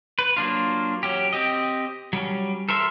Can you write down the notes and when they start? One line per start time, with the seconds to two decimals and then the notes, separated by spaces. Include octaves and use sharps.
0.19 B4
0.37 F#3 A#3 D4 F4
1.03 F#3 C#4 G4
1.33 C4 G4 D#5
2.13 F#3 G3 C#4
2.69 A4 A#4 C5 E5